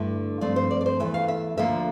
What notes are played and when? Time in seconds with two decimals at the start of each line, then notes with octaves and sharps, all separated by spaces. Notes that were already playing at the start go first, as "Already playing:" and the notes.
Already playing: G2 D3 A3 E4
0.41 G2 F3 A3 C4 D5
0.56 C5
0.71 D5
0.81 D5
0.86 C5
1.00 E2 E3 A3 E5
1.14 F5
1.28 E5
1.58 D2 D3 F3 A#3 E5